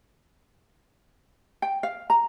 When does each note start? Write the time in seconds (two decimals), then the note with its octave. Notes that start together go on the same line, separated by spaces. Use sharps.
1.62 G5
1.83 F5
2.10 A#5